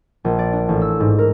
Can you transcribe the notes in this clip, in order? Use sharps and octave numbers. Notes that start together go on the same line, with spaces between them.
A#1
D5
D4
A1
E6
G#2
A#4